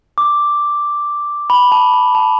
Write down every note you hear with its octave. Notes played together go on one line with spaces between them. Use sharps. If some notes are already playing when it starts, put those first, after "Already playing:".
D6
B5
A5
B5
A5